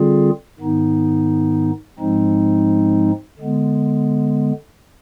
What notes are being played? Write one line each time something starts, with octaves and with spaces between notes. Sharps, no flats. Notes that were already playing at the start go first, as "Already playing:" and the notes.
Already playing: D3 G3 C4 F4 G#4
G#2 D#3 B3 D#4
G#2 F3 G#3 C4 D#4
D3 G#3 B3